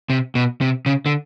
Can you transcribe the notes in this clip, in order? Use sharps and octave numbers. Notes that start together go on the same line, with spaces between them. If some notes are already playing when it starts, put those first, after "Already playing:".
C3
B2
C3
C#3
D3